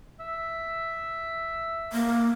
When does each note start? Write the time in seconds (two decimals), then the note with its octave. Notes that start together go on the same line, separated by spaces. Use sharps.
0.20 E5
1.93 A#3